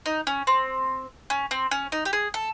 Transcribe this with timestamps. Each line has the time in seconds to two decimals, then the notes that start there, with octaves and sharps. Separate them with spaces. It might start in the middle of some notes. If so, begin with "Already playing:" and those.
0.06 D#4
0.27 C#4
0.47 C4
1.30 C#4
1.51 C4
1.71 C#4
1.92 D#4
2.05 G4
2.13 G#4
2.34 A4